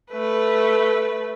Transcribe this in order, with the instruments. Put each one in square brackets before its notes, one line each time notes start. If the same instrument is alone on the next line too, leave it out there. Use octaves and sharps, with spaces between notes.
[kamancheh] A3 B4